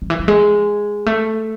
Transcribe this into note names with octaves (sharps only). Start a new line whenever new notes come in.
D#3
E3
F3
G#3
A3